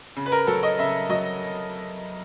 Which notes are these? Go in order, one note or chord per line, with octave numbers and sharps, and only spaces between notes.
C#3
B4
A#4
F#3 A4
D#5
C#3 E5
F#3 D#5